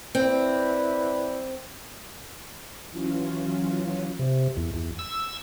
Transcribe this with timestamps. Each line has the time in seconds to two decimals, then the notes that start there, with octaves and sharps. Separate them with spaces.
0.15 C4 E4 B4 D5
2.90 E3 F#3 C#4 F4
4.19 C3
4.57 E2
4.74 E2
4.99 E6